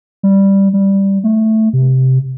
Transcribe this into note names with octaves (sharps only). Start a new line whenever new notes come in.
G3
G3
A3
C3